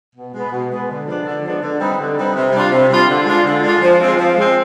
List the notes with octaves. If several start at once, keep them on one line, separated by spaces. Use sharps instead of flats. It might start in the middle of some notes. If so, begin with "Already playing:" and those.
B2
G#3 B3
B2
G#3 B3
D3
F3 G#3 B3 D4
D3
F3 G#3 B3 D4
D3
G3 C4 D#4 B4
D3
G3 C4 D#4 B4
C3
G3 D4 F4
C3
G3 D4 F4
D3
G#3 D4 F4
D3
G#3 D4 F4
F3
C4
G#3
F3
G#3 C4